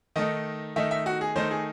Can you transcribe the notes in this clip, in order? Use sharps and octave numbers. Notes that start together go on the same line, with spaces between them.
D#3 A3 D#4 D#5
D#3 A3 D#4 E5
E5
F#4
G#4
D#3 A3 D#4 C5
G#4